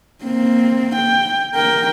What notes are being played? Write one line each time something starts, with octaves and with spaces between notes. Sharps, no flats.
A#3 C4
G5
A#4 G5